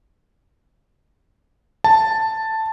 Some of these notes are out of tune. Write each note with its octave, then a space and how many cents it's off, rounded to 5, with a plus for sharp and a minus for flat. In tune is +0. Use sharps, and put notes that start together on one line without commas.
A5 +5